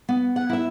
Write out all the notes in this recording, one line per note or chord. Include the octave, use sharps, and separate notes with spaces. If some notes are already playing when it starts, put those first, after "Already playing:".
B3
F#5
E4 E5